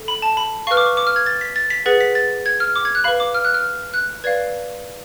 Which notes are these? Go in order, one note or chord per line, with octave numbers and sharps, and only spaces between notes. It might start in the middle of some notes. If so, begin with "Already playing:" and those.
Already playing: A4
B5
A5
B5
B4 F5 C#6 F6
D6
C#6
D6
F6
G#6
A6
B6
A6
B6
G#4 B4 F#5 A6
B6
A6
G#6
F6
D6
G#6
F#6
B4 F5 B5
D6
F6
F#6
F6
F#6
B4 D5 F5 G#6